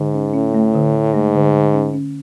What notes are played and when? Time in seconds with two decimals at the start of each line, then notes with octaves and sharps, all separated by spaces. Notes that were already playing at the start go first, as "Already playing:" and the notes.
Already playing: G#2 D3
0.14 C#4
0.34 A2 C#4
0.54 A3
0.74 D3
0.94 D3
1.14 G#2 A3
1.34 D3
1.54 D3
1.74 C#4
1.93 C#4